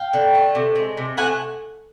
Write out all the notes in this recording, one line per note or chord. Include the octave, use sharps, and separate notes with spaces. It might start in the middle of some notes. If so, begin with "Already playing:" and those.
Already playing: F5 G5
D3
A3
C3
G#3
C3
A3 F#5 G#5